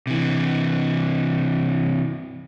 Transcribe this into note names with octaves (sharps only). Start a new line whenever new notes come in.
C3 E3